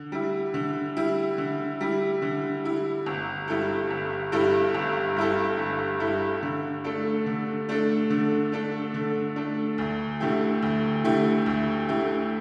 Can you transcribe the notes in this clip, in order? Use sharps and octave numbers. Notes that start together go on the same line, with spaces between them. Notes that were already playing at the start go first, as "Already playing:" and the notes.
Already playing: D3
G3 E4
D3
G3 E4
D3
G3 E4
D3
G3 E4
G1
G2 G3 E4 A4
G1
G2 G3 E4 A4
G1
G2 G3 E4 A4
G1
G2 G3 E4 A4
D3
A3 D4 A4
D3
A3 D4 A4
D3
A3 D4 A4
D3
A3 D4 A4
D2
D3 A3 E4 G4
D2
D3 A3 E4 G4
D2
D3 A3 E4 G4